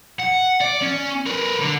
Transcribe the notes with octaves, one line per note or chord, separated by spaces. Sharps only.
F#5
D5
C#4
A#4 B4
D3